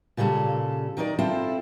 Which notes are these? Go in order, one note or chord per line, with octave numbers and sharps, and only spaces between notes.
A#2 C#3 G3 A#3 A4
D#3 D#4 A#4 D5
C4 E4 F4 A4 C5